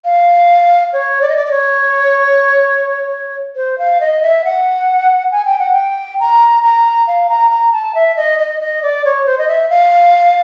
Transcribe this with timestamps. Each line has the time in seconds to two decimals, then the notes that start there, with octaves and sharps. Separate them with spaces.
0.05 F5
0.93 C#5
1.22 D5
1.29 D#5
1.36 D5
1.46 D5
1.51 C#5
3.56 C5
3.79 F5
4.01 D#5
4.23 E5
4.45 F#5
5.31 G#5
5.45 G5
5.59 F#5
5.72 G5
6.20 A#5
6.63 A#5
7.07 F5
7.29 A#5
7.51 A#5
7.73 A5
7.95 E5
8.17 D#5
8.39 D#5
8.60 D#5
8.83 D5
9.05 C#5
9.27 C5
9.38 D#5
9.48 E5
9.70 F5